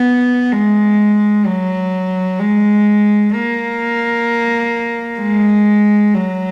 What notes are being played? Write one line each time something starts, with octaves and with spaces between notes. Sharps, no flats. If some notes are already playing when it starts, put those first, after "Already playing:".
Already playing: B3
G#3
F#3
G#3
A#3
G#3
F#3